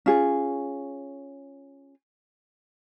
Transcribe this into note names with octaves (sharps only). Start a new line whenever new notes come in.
C#4 F4 G#4